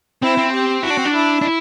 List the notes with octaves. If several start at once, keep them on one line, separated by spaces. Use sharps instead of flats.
C4 E4
C4
G4
E4 F#4
D4
C4
D4
E4
D4
E4